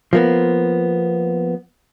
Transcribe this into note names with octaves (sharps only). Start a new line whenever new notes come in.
F3 A#3 B3